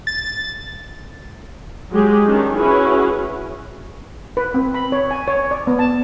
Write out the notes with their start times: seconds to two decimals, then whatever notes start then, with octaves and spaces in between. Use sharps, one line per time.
0.07 A6
1.92 F#3 G#3 G4 G#4
2.26 D#3 C#4 D4
2.57 C#4 E4 F#4 G#4 B4
4.37 B4
4.54 C4
4.74 B5
4.92 C#5
5.11 G#5
5.27 C#5
5.51 D5
5.67 B3
5.79 A5